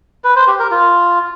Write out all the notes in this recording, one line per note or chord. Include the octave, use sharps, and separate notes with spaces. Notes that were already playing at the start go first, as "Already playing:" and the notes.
B4
C5
G4
A#4
F4